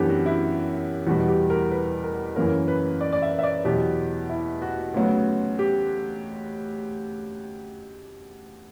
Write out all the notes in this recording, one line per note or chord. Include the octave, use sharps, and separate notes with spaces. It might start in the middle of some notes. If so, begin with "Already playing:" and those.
Already playing: F#2 E3 B3 D4 G4
F#4
E4
E2 B2 G3 F#4
G4
A#4
B4
A#4
F#2 C#3 E3 A#3 C#4 A#4
B4
D5
D5
E5
E5
D5
E2 B2 F#3 B3 G4
E4
F#4
D2 C#3 F#3 B3
G4